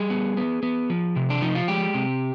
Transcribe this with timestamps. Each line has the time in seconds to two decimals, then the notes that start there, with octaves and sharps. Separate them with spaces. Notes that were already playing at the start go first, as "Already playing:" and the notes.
Already playing: G3 G#4
0.10 B3
0.37 B3
0.63 B3
0.90 F3
1.16 C3
1.30 D4
1.42 F3 D#4
1.55 F4
1.68 G#3 G4
1.94 C3